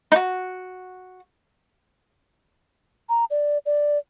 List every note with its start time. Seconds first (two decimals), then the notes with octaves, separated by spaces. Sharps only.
0.12 D#4 F#4
3.09 A#5
3.30 D5
3.66 D5